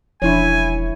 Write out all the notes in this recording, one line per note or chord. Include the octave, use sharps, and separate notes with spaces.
E1 F3 D4 E4 C#5 G#5